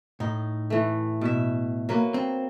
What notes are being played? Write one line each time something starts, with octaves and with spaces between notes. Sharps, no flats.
A2 D#4
E3 A3
B2 E5
F#3 A#3 B4
C4